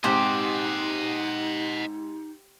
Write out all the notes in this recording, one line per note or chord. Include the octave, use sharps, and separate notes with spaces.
G#2 C3 D#4 G4 C5 D#5 F#5